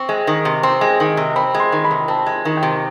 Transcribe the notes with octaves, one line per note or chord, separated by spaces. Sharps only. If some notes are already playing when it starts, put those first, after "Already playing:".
Already playing: C4 C#6
G#3
D#3
C3
C4 C6
G#3
D#3
C3
C4 B5
G#3
C6
D#3
B5
C3
C4 A5
G#3
D#3
G5
C3